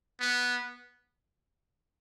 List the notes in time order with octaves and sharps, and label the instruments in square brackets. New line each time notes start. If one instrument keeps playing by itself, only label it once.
[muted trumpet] B3